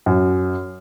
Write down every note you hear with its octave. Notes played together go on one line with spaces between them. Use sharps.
F#2